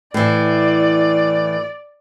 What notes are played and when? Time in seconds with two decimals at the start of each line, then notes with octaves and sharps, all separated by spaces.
0.14 A2 E3 D5